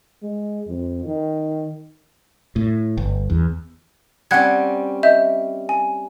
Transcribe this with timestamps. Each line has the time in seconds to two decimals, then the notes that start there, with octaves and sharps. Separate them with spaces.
0.23 G#3
0.68 F2
1.06 D#3
2.56 A2
2.98 G1
3.30 E2
4.31 G3 C4 C#4 F#5 F#6 G#6
5.03 D#5 E5 G6
5.69 G#5